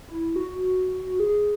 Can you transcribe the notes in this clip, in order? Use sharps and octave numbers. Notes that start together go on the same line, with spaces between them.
E4
F#4
G#4